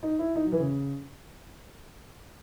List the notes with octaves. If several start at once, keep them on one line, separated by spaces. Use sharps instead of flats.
D#4
E4
D#4
F#3
E3
C#3